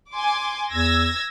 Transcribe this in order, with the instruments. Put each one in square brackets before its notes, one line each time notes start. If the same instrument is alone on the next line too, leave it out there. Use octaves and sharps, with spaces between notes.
[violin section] G#5 C6 D6
[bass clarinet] E2 [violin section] E6 G#6 A#6